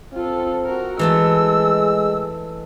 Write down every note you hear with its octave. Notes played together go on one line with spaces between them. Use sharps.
C4 F4 A4
F#4 A#4
E3 G#3 A3 A4 E6